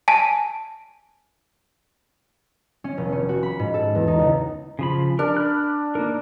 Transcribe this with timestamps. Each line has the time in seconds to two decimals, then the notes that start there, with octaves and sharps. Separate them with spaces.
0.08 G#5 A5
2.84 C#4
2.98 F1
3.12 C#4
3.29 F#4
3.43 B5
3.59 G#2
3.74 A4
3.95 E2
4.08 D#4
4.19 C#2
4.79 C#3 F3 B5
5.19 D4 A#4
5.37 B5 F6 F#6
5.95 A#3 D#4 A#4